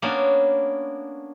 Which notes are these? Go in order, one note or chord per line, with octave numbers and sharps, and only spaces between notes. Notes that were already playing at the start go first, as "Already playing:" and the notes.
A#3 B3 C#4 D4 F#4